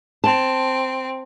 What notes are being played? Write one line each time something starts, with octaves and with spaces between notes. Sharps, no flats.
C4 A5